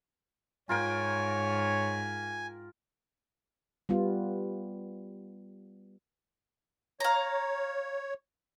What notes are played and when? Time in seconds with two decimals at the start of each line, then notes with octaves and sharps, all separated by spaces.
0.69 G#2 F4 A#4 C#5 G5 G#5
3.89 G3 B3 F4
7.00 C#5 F5 A#5